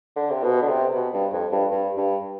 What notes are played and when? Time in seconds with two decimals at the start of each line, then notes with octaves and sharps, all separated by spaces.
0.16 D3
0.30 C3
0.43 B2
0.62 D3
0.68 C3
0.95 B2
1.13 G2
1.33 F2
1.52 G2
1.71 G2
1.97 G2